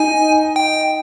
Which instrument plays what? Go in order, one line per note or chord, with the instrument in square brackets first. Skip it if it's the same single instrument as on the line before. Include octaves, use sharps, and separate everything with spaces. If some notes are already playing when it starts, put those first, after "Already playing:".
Already playing: [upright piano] D#4 [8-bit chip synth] G#5
[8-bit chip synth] G5